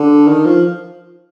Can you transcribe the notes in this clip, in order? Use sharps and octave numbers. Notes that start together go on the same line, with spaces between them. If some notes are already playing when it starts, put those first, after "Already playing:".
Already playing: D3
D#3
F3